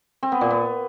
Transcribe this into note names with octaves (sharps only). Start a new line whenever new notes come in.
C4
B3
A#2
B3